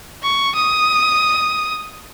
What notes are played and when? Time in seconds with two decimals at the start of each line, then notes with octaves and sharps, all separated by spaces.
0.23 C#6
0.55 D#6